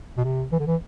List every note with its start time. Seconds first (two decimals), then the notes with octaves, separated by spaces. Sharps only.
0.17 B2
0.24 C3
0.52 E3
0.60 D3
0.67 E3